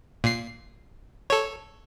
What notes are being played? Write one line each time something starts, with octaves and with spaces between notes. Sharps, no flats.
A#2 C7
A4 C#5